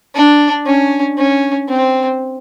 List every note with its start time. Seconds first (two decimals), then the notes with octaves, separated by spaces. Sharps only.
0.15 D4
0.66 C#4
1.18 C#4
1.69 C4